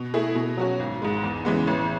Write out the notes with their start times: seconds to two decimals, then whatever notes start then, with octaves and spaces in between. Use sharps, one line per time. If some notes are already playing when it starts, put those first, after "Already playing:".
Already playing: B2
0.14 A3 E4 G#4
0.35 B2
0.57 F#3 C#4 F#4
0.79 G#1
1.02 G#2 G#3
1.23 E2
1.45 C#3 E3 G#3 B3
1.67 A1